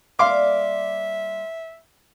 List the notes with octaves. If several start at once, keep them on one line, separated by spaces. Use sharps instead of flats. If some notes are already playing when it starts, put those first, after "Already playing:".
G3 A#3 D5 E5 F5 C6 D6